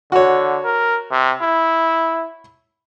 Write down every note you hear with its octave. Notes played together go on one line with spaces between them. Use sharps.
D3 F#4 C#5
A#4
C3
E4